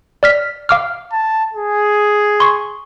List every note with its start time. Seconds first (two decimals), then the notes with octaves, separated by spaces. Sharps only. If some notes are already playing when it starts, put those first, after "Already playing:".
0.23 D5 F6 B6
0.69 F5 D6 F6
1.12 A5
1.53 G#4
2.40 C6 C#6